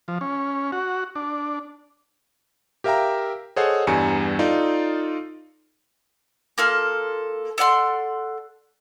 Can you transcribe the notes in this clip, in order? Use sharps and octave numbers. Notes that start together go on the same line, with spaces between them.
F3
C#4
F#4
D4
G4 A#4 E5 F5 G5 A#5
G#4 A4 C5 C#5 D#5 F#5
E2 G2 G3 G#5 A#5 C#7
D#4 F4 A4 D5
A#3 F4 A4 F6
A4 D5 F#5 C6